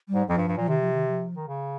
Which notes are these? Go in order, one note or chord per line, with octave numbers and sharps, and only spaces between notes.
G3
G#2
F2 F3
G2
G2
A#2 F3
C3 D#3
F3
D#3
F3
D#3
C#3